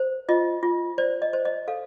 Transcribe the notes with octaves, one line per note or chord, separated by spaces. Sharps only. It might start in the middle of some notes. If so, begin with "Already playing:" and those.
Already playing: C5
F4 D#5
F4
C5 D5
D#5
C5
D#5
A4 F5